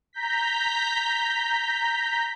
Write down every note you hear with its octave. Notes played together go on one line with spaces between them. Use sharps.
A#5 G6 B6